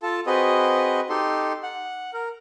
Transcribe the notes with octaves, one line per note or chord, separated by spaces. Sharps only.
F4 A4 A5
C4 F#4 G#4 B4 D#5
D#4 G4 A4 C6
F#5
A#4